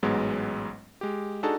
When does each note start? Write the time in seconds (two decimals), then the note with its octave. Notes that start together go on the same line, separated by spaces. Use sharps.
0.03 A1 G#2 F#3 G#3 B3
1.01 G#3 G4
1.43 D4 D#4 F#4 G#4 A4 A5